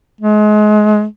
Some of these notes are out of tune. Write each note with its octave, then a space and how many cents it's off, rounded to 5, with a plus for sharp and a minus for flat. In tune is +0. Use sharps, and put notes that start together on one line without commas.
G#3 +30